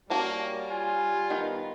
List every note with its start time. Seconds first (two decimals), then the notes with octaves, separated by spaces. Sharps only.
0.10 G3 A#3 C#4 F#4 A5
0.70 F4 G#5
1.30 D#3 B3 A#4